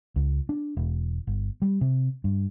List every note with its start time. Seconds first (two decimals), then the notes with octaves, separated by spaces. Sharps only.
0.16 C#2
0.49 D4
0.77 E1
1.27 G1
1.62 G3
1.81 C3
2.24 G2